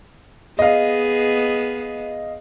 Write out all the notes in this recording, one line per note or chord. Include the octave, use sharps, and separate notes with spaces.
B3 G#4 D#5 F5